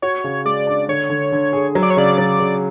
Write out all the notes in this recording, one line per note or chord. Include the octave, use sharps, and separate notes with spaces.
F#4 C#5
C#3
G#3 D5
D4
D3 C#5
D3
D3
G#4
F#3
D5
C#5
C#3 D5
F#3
C#3